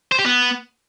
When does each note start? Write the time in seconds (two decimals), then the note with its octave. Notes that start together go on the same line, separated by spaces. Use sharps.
0.12 C5
0.19 G4
0.26 B3